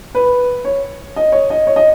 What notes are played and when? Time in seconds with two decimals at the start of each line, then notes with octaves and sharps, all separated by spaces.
0.15 B4
0.65 C#5
1.16 D#5
1.32 C#5
1.50 D#5
1.67 C#5
1.76 D#5